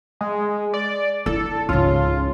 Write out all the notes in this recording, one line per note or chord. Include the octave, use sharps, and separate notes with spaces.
G#3
D5
E4 A4
C#2 G#2 C#4 F4